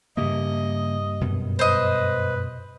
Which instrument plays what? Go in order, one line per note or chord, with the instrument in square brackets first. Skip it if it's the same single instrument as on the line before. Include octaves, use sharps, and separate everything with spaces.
[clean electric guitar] G2 G4 E5 [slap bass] C#3 A#3 [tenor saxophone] D#5
[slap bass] F#2 B2
[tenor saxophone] B4 [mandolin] C5 D#5